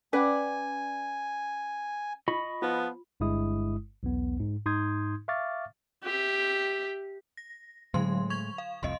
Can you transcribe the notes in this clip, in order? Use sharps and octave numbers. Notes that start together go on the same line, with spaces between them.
C#4 B4 D5 F#5 G#5
F4 D#5 B5 C#6
F3 B3 F4
G1 G2 G#3 E4 D#6
B1 E2 B3
G#2
G#2 D#4 C6 D#6 G6 G#6
E5 F5 C#6 D6 F6 A6
G4 E5
A#6
A2 D3 F#3 G#3 C6
C#6 G#6 F7
F5
F1 C2 F2 D#5 C6